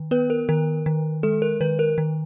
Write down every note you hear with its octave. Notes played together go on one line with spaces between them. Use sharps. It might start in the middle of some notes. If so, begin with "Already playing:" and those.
Already playing: D#3
B3 B4
A#4
D#3 A#4
D#3
G#3 A4
A#4
D#3 B4
A#4
D#3